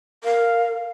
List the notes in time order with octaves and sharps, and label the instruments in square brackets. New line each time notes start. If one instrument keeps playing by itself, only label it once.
[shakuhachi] A#4 [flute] F5